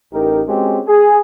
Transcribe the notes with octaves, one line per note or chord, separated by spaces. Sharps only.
A1 D#4 G4 A#4
G#3 C4 C#4 F#4 G4
G#4